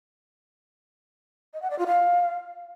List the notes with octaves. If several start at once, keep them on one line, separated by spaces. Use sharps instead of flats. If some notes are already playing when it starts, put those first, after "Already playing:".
D#5
F#5
D5
F4
F5